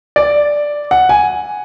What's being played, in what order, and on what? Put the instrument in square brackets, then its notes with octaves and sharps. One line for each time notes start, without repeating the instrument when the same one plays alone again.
[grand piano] D5
F#5
G#5